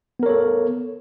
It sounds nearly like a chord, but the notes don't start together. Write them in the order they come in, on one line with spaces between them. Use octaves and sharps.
B3 A#4 C#5 A4